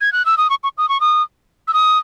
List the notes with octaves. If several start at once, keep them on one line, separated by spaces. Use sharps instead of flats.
G#6
F#6
E6
D#6
C#6
C#6
D#6
C#6
D#6
E6
D#6